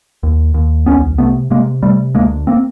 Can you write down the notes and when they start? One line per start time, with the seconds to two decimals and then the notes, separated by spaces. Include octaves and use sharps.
0.23 D#2
0.54 D#2
0.86 C2 B3 C#4
1.18 C3 A3 B3
1.50 C3 G#3 A#3
1.83 C3 G3 A3
2.15 D2 G#3 A#3
2.47 A#3 C4